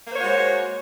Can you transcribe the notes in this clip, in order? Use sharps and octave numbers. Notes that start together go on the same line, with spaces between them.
G#3 A#3 F#4 C5 C#5